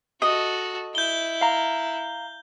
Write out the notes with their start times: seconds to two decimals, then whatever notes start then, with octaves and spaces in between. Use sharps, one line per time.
0.22 F#4 A4 D#5
0.95 E4 G6 G7
1.41 F5 A#5